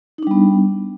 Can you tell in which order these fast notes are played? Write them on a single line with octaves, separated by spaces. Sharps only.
D#4 D4 G3 B3